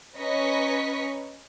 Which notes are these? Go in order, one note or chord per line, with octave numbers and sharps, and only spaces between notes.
C#4 B4 D#5 A#5 C#6 B6